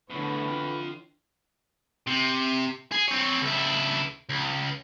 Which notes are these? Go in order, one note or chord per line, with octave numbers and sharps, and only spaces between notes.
E2 A2 D3 E3 B4 C#5
F4 G5
C3
G#4
C4 C#5
C#2 E4
C#2